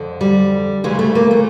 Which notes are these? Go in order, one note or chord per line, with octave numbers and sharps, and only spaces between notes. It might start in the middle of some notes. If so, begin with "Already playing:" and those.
Already playing: F2 D3
G3
D2 C#3 E3 G#3
A3
A#3
A3